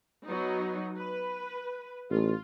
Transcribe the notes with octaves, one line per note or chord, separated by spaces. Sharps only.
F#3 B3 D#4
B4
A1 F4